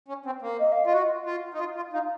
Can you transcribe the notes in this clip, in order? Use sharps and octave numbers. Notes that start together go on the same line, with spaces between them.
C#4
C4
A#3
D#5
F5
F4 D#5
F#4
F4
D#4
F4
F4
D#4 F5